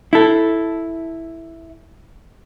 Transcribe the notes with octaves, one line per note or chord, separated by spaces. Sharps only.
E4 A4